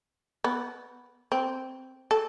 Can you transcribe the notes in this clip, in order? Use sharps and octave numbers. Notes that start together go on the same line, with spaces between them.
B3
C4
A4